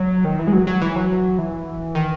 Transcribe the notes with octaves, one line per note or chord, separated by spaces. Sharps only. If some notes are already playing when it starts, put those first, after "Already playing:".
Already playing: F#3
D#3
E3
G#3
F#3
F#3
E3
F#3
E3
D#3